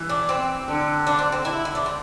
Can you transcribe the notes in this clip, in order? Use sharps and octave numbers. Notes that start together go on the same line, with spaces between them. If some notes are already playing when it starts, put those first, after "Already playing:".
Already playing: E3
D4
C4
D3
D4
C4
C4
E4
E4
D4
C4